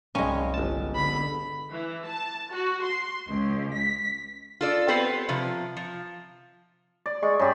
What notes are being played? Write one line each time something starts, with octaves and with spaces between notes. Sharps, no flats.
C2 G2 F#3 G#3 C#4
G1 A5
D3 B3 B5
E3
A5
F#4
C6
C#2
B6
F4 A4 D5
B3 C4 G4 B4 C5
C3 F3
F3
D5
G#3 C#6
G2 C#4 G4 D5